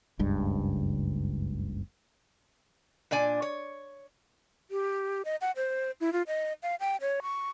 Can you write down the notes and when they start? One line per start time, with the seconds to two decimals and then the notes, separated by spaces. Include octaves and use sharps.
0.19 F#1 C#2 G2
3.11 A#2 D4 D5 G#5
3.42 C#5
4.70 G4
5.25 D#5
5.41 F#5
5.56 C5
6.01 E4
6.13 F4
6.27 D#5
6.63 F5
6.80 G5
7.01 C#5
7.22 C#6